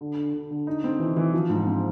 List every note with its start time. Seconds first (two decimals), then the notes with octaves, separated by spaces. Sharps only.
0.01 D3
0.16 D3
0.33 D3
0.51 D3
0.67 D#4
0.84 C4
1.00 E3
1.17 E3
1.33 F3
1.50 G#2
1.66 C4